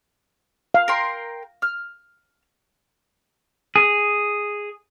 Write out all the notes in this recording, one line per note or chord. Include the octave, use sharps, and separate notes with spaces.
F5
A#4 G5 C6
F6
G#4